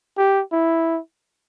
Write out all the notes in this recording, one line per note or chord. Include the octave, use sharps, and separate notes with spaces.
G4
E4